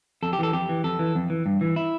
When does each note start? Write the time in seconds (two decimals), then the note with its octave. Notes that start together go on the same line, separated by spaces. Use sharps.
0.23 F2 A4
0.33 G4
0.39 E3 A4
0.53 F2 G4
0.69 E3
0.84 F2 A4
0.99 E3
1.15 F2
1.30 E3
1.46 G2
1.61 E3
1.76 E4